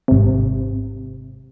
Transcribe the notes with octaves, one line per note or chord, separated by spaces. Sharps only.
G#1 C3